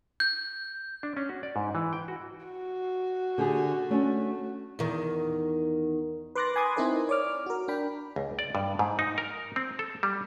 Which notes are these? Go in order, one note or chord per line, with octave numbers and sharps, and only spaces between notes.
G6
D4
C#4
F#4
D5
G#2
E3
G5
F#4
F#4
D3 G4 G#4
A3 C#4 D4
E2 D#3
B4 C6 D6 F#6 A6 A#6
G#5 B5 C6 D6 D#6 G#6
C4 D#4 E4 A#4 C5 G#5
C#5 D5 D6 F6
F#4 A#4
D4 G5 B5
C#2
D5
G2
G#2
D#4
A#4
C4
A4
G3